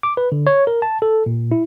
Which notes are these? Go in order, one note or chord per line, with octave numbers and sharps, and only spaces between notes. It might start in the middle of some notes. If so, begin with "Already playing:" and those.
D6
B4
D3
C#5
A#4
A5
A4
A#2
E4